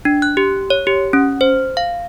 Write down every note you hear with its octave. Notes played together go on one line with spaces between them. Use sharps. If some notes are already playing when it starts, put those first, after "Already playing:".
D4
F#6
G4
C#5
G4
C#4
C5
F5